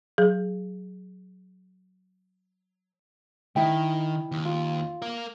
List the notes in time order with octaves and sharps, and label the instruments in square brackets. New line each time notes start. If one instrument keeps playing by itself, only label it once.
[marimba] F#3 G#4
[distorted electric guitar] D#3 [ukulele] D#4 E4 G5
[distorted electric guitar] D#2
[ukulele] F4
[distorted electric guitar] A#4 F5